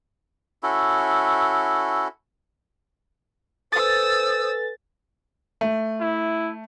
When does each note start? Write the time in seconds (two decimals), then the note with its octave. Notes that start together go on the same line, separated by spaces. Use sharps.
0.63 C#4 E4 F#4 A4
3.73 A4 B4 C5 G#5 D#6 E6 A6
5.61 A3
6.01 E4